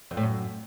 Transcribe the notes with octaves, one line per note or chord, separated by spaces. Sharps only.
F2
A2
F#2